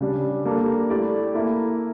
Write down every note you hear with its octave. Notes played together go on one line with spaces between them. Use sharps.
C#3 G3 D4
G3 A#3 D4 A4
A3 E4 G4 D5
A#3 E4 A4 E5